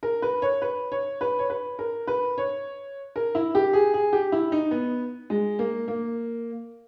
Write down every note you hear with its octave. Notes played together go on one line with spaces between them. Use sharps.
A#4
B4
C#5
B4
C#5
B4
C#5
B4
A#4
B4
C#5
A#4
E4
G4
G#4
G#4
G4
E4
D#4
B3
G#3
A#3
A#3